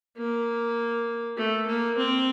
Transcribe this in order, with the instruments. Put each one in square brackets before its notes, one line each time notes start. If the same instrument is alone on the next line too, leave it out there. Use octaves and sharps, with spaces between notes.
[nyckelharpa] A#3
A3
A#3
C4